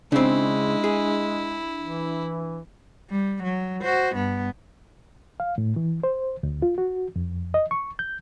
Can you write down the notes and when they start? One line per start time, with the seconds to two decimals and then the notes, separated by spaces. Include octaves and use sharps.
0.12 C#3 G#3 C4 D4 E4
0.84 G#4
1.82 E3
3.10 G3
3.43 F#3
3.82 F#4 C5
4.15 G2 B3
5.40 F5
5.58 A2
5.76 E3
6.03 C5
6.43 D2
6.62 F4
6.78 F#4
7.16 F2
7.54 D#5
7.71 C#6
7.99 G6